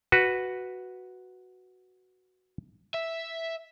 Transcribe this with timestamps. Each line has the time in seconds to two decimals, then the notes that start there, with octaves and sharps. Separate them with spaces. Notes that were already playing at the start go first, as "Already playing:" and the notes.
0.12 F#4 B4
2.94 E5